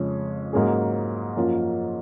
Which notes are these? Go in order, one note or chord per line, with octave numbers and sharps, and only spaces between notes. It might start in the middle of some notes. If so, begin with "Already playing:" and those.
Already playing: F2 C#3 G#3 C#4 G#4
G#2 F#3 A#3 C#4 G#4
F#2 F3 A#3 C#4 F4